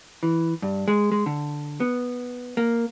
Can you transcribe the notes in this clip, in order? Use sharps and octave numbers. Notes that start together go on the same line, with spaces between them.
E3
G2
G#3
G#3
D3
B3
A#3